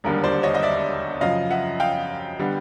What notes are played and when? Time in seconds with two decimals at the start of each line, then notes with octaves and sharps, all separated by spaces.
0.04 E1 D#2 D3 G3 A#4
0.24 C5 D5
0.43 C#5 D#5
0.54 D#5
0.63 D5 E5
1.21 F#2 C#3 F3 D#5 F5
1.51 E5 F#5
1.80 F5 G5
2.39 D3 G3 B3